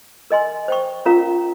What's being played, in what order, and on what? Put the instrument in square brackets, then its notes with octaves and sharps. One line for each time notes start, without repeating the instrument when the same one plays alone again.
[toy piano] A#4 D#5 G#5 C6
C5 G5 C#6
C#4 F4 A#4 F5 A#5